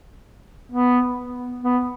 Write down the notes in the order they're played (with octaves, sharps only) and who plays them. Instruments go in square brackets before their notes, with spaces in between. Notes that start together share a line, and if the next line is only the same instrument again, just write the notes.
[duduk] B3
B3